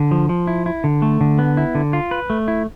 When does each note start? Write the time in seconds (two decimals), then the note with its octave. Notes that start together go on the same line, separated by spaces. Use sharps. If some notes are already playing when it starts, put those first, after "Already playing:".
Already playing: D3
0.11 F3
0.29 F3
0.47 E4
0.66 E4
0.84 D3
1.02 A3
1.21 D3
1.39 B3
1.57 E4
1.75 D3
1.93 F4
2.11 B4
2.30 A3
2.48 E4